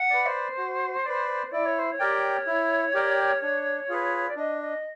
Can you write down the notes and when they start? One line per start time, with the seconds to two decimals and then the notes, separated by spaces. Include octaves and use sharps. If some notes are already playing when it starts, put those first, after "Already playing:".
Already playing: F#5
0.10 B4 D5
0.26 C5
0.57 F#4
1.05 B4 D5
1.51 E4 D5
1.65 C#5
1.78 C5
1.91 C#5
1.99 G4 A#4 D5 G5
2.47 E4
2.94 G4 A#4 D5 G5
3.42 D4
3.89 F4 G#4 B4
4.27 D5
4.36 D4 D#5
4.61 D#5